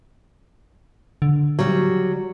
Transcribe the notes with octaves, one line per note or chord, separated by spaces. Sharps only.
D3
F#3 G3